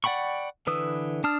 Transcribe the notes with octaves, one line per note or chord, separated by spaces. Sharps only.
D5 F#5 G5 B5 C#6
D3 E3 B4 D#6 E6
D4 A5 D#6 F6